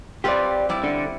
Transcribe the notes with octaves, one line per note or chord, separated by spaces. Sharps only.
C4 F4 G4 B4 D5
G3 E4 D5
D3